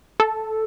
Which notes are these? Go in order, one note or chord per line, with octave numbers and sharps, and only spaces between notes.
A4